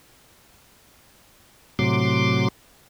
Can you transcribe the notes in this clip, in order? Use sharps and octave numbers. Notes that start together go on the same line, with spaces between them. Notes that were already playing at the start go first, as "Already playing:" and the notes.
A2 C3 F#3 C6 D6